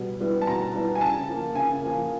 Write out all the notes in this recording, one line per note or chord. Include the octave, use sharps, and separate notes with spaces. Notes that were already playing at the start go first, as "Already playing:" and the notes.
Already playing: B2 G3 B3
G3 B3 E4
A5
B2 A#5
G3 B3 E4
G#5
C#3 A5
F3 A#3
C#3 G#5
F3 A#3